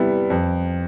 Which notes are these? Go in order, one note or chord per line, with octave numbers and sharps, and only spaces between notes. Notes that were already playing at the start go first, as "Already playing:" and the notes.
Already playing: C3 G3 B3 E4
F2